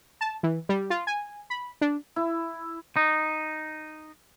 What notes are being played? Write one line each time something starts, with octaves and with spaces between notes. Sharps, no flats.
A5
E3
G3
F4
G#5
B5
D4
E4
D#4